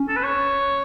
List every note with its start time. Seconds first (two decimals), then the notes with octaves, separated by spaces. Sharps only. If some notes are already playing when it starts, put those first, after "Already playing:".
Already playing: C#4
0.08 A4
0.16 B4
0.23 C#5